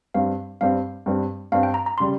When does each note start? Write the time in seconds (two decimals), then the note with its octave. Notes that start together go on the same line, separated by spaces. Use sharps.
0.14 G2 G3 C4 F5
0.61 G2 G3 C4 F5
1.06 G2 G3 C4
1.52 G2 G3 C4 F5
1.63 G5
1.74 A#5
1.86 A#5
1.98 C#3 G3 C6